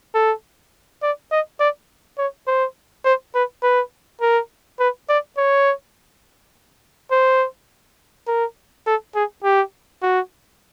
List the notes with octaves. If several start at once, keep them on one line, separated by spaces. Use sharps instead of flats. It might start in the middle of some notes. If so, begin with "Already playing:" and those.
A4
D5
D#5
D5
C#5
C5
C5
B4
B4
A#4
B4
D5
C#5
C5
A#4
A4
G#4
G4
F#4